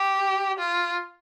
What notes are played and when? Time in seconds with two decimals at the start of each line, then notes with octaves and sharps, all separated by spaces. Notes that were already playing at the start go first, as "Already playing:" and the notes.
Already playing: G4
0.59 F4